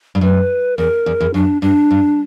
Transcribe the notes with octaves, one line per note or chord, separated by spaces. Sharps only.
G2
F#2 B4
E2 A#4
E2
E2
F#2 D4
G2 D4
G2